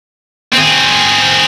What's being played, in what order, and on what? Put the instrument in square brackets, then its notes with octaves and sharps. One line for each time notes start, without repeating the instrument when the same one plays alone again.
[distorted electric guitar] C4 G#4